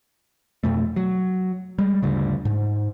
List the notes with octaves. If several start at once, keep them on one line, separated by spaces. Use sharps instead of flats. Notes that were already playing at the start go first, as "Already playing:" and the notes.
F2 B2 A3
F#3
G3 G#3
D2 G2 C#3
G#2